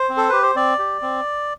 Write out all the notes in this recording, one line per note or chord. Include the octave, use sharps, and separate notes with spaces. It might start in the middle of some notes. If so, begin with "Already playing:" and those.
Already playing: C5
C4
A4
G4 B4
C5
C4 D5
G4
C4